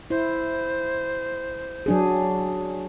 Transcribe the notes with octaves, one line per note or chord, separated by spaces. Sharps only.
E4 C5
F#3 D4 G#4